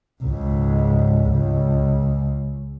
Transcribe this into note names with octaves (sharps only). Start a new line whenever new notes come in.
C#2 G#2
C#2